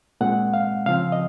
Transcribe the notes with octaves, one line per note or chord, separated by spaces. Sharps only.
A#2 G#3 C4 F#5
F5
C#3 F3 C4 F5
D#5